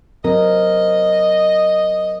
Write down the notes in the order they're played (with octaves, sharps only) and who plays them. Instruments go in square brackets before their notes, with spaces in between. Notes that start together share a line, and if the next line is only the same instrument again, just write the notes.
[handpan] F#3 C4 A#4 [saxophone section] D#5